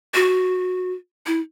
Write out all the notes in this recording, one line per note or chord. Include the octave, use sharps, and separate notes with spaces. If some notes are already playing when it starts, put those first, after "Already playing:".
F#4
E4